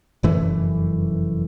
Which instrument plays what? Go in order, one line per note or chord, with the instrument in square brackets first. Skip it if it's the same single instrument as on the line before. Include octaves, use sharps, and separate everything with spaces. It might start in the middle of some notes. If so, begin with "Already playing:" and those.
[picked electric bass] F1 F#2 E3 A3